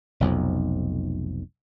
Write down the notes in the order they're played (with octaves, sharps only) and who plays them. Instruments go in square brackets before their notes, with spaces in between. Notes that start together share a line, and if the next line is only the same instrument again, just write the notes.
[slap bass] F1 B1 F2